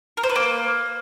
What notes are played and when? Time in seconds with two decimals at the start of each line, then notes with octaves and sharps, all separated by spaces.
0.17 A#4
0.23 C5
0.30 B4
0.36 A#3